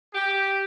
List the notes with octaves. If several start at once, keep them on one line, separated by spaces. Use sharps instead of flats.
G4